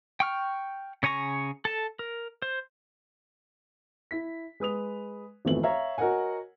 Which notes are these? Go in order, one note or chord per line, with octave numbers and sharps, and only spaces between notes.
G5 C#6 F6
C#3 C#5 G#5 A#5 C#6
A4 A5
A#4
C5
E4 B6
G#3 B4 D#6 F7
G#1 F2 E3 A3 B3 F#7
C#5 E5 F5 A#5
F#4 A#4 C#5 D#5 F#5 G#5